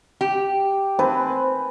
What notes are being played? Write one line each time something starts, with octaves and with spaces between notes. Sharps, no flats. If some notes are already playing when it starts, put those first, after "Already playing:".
G4
C4 B4 G#5 A5